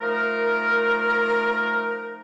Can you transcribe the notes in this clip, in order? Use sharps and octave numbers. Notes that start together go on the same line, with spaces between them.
F3 A3 D#4 A#4